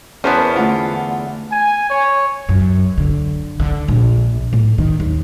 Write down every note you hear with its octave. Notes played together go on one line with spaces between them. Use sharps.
E2 B3 C#4 A#4 C5 A5
D3 A3 F4 F#5
G#5
C#5
F#2
D3
D3
A#1
A2
D#3
D#2